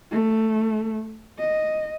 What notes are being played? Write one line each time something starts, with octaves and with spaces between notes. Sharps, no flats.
A3
D#5